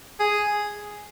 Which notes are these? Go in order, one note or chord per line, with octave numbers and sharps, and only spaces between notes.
G#4